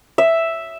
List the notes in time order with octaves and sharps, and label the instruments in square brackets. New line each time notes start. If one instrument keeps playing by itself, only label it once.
[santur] E5